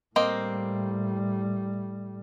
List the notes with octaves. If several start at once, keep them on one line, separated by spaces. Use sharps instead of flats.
A2 G3 A#3 C4 D#5